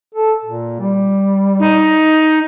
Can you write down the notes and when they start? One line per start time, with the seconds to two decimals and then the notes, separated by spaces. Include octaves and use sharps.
0.15 A4
0.45 A#2
0.80 G3
1.59 D#4